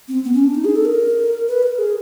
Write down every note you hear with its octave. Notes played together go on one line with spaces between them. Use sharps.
C4
B3
C#4
D4
D#4
G#4
A4
A#4
B4
A#4
G#4